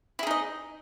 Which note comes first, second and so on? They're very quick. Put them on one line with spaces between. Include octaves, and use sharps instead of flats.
E4 G#4 D#4 D#5